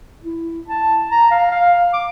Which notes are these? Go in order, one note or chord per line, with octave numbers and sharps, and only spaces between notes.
E4
A5
A#5
F5
F5
D6